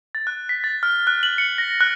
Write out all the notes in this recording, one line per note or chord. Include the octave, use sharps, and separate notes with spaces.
A6
F#6
B6
A6
F6
F#6
F#7
C#7
A#6
F#6